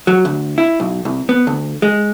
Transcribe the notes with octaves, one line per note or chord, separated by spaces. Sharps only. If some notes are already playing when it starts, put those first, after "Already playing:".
F#3
D2
E4
B1
C2
B3
D2
G#3